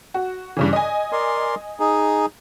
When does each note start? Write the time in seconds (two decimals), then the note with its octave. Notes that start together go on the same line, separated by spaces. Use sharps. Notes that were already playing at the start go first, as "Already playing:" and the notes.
0.14 F#4
0.57 G2 C#3 E3
0.73 D#5 G#5
1.12 A#4 D5 C6
1.80 D#4 G#4